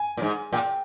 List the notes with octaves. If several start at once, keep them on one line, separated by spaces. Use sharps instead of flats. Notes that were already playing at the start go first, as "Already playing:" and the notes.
Already playing: G#5
A#2
G#2
A#2 G5